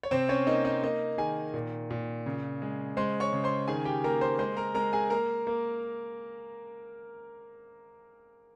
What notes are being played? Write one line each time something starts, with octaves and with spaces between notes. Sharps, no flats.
C#5
C3 C4 C5
C#4 C#5
A#3 D#4 D#5
D#4 D#5
A#3 D#4 D#5
D#3 G#4 G#5
A#2
A#2
C#3
G#3
G#3 C5 C6
C#5 C#6
C#3
C5 C6
D#3 G#4 G#5
G4 G5
A#3 A#4 A#5
C5 C6
G#3 C5 C6
A#4 A#5
G#3 A#4 A#5
G#4 G#5
A#3 A#4 A#5
A#3